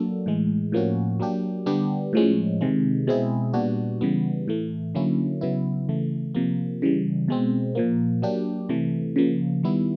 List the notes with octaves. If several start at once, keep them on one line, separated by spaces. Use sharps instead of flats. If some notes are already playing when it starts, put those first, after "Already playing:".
Already playing: F#3 A#3 D4 F#4 A4
A2 E3 G#3
A2 F3 A#3 C#4 F#4
F#3 A#3 D4 G4
D3 G3 B3 D4 G4
A2 F3 G#3 C#4
C3 D#3 G#3
B2 G#3 C4 E4 G#4
A#2 G3 B3 D4 F#4
C#3 E3 G3 B3
A2 E3 A3
D3 F#3 A#3 C#4 E4
C#3 F#3 B3 E4
C#3 E3 A3
C3 F3 A#3
C#3 E3 G3
B2 G#3 C4
A#2 F3 A#3
F#3 A#3 D4 G4
C3 E3 A3
C#3 F3 A#3
D#3 G3 B3 E4